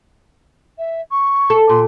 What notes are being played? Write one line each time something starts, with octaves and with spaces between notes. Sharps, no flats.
E5
C#6
A4
A#2 C6